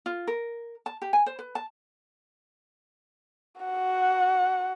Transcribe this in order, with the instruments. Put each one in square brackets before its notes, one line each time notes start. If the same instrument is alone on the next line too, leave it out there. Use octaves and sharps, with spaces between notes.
[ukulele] F4
A#4
A5
G4
G#5
C5
B4
A5
[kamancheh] F#4 F#5